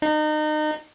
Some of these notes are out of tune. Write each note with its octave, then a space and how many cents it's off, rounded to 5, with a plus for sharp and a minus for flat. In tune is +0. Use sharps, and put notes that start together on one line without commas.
D#4 -30